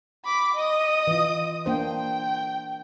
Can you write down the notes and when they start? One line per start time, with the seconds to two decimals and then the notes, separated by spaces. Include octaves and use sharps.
0.25 B5 D6
0.54 D#5 D#6
1.07 E3 F4
1.66 A#3 D4 C5 G5